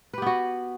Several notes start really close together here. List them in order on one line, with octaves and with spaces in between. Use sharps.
B4 G4 B3 F#4